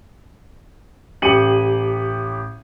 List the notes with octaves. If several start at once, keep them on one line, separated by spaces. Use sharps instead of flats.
A1 G4 C#7 D#7 F#7